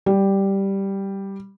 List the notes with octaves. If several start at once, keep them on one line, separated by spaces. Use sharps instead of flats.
G3